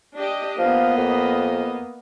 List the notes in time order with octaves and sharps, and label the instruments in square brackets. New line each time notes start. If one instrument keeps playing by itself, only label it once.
[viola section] D4 G4 D#5
[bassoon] F3 [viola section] A#3 B3 D#5
[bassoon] F2